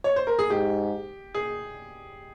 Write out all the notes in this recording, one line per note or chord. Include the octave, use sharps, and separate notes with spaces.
C#5
C5
A#4
G#4
G#2 G4
G#4